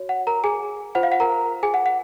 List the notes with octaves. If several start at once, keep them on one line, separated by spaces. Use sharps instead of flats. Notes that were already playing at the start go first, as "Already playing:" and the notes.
Already playing: F#4 C#5
F#5
A#4 A#5
G#4 G#5
F4 C5 F#5
F5
F#5
A#4 A#5
G#4 G#5
F#5
F#5